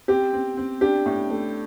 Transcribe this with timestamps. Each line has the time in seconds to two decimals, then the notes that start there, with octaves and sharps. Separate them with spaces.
0.08 C4 G4
0.33 C4
0.57 C4
0.81 D4 G4
1.06 A2
1.30 A3